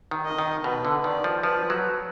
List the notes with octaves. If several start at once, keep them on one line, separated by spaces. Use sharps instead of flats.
D#3
D#5
D#3
B2 B4
D3
D#3 D5
F3
F3 B4
F#3